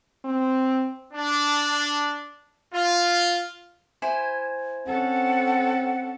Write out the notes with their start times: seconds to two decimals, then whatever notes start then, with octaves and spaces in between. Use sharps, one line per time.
0.25 C4
1.13 D4
2.74 F4
4.02 E4 C5 G#5
4.87 C4 C#4 A4 F#5